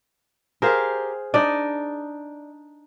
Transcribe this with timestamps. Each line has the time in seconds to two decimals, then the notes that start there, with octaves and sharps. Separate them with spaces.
0.62 G4 G#4 A#4 C5 F5
1.34 D4 D#4 D5 D#5